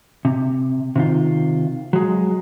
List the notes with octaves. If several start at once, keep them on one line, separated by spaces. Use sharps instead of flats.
C3
C3 D#3 F4
F#3 G#3